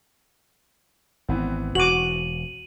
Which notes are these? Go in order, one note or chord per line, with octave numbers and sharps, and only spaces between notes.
G#1 E3 B3 C4
E1 F#4 D6 D#7 F#7